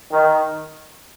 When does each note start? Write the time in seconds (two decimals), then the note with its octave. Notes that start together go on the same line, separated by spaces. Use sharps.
0.11 D#3